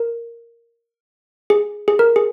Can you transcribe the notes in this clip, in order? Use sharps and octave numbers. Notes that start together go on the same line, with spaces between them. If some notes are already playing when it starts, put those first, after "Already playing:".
Already playing: A#4
G#4
G#4
A#4
G#4